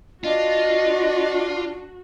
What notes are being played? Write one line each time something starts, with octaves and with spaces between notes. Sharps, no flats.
D4 F4 F#4 D#5